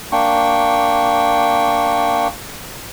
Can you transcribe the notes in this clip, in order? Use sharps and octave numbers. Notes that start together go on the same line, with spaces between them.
A#3 D4 G5 C#6